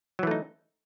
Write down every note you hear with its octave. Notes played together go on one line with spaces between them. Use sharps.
E3 F#3 A3 D#4